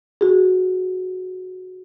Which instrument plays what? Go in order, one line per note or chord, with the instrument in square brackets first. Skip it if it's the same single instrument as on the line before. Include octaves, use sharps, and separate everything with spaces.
[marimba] F#4 G#4